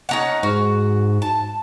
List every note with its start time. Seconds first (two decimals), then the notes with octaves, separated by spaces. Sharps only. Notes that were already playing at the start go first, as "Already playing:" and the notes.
0.09 C#4 D#4 F#5
0.43 G#2 F#4
1.22 A5